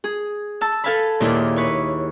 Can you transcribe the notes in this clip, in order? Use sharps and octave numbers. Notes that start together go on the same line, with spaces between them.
G#4
A5 E6
A4 B4 F5 G#5 A5 B5
D#2 A#2 D#4 E4 G#4
B4 C#5